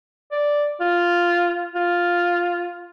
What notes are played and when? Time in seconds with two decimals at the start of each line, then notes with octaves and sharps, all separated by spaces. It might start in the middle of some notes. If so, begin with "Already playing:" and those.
0.32 D5
0.80 F4
1.75 F4